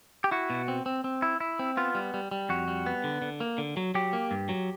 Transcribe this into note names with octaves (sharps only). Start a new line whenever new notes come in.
G4
E4 F#4
B2
C4
C4
C4
E4
E4
C4
B3 F4
G3
G3
G3
F2 F#4
G3
B3
D3
D3
A#3
D3
F#3
F#3 G4
A#3
G2
F#3